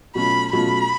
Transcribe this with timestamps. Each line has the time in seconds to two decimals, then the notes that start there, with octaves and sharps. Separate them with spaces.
0.15 B2 F#3 A3 C#4 F4 B5
0.53 B2 F#3 A3 C#4 F4 B5